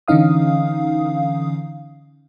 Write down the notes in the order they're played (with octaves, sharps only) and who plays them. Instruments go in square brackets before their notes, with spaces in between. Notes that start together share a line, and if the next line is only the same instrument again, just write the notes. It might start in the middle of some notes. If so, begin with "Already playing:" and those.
[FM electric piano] D3 E3 C#4 D#4 F5 D#6